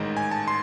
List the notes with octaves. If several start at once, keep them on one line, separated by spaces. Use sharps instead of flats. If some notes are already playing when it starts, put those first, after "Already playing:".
Already playing: A1 G#2 D#3 G#3
G#5
A5
C6